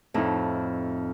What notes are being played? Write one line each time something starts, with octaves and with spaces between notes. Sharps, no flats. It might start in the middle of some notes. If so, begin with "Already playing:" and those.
F2 A2 D#4 E4